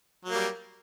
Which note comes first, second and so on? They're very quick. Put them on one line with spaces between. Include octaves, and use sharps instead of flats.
F#3 A#3 G3